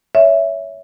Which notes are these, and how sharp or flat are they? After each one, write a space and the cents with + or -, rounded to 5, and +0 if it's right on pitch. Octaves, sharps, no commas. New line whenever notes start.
C#5 +20 E5 +0